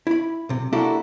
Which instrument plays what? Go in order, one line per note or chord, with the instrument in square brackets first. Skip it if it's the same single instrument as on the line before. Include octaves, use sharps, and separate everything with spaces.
[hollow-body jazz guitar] E4 B5
B1 C3
A#3 D4 E4 F#4 G4 A4